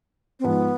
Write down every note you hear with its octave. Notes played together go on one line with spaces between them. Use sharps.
C4
G#2 F3 G#3 B3